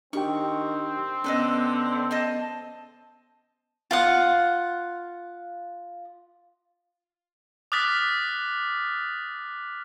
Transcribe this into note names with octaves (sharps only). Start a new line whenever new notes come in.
D#3 C4 D4 G4 G5 C#6
D3 B3 C#4 A4 B4 D#5
C5 D#5 A5
F4 F5 F#5
D6 D#6 F6 F#6 A6 B6